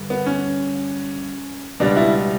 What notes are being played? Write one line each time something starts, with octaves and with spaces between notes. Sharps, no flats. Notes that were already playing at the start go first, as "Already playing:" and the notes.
Already playing: G2 D3
B3
C#4
C#2 B2 G3 D4
E4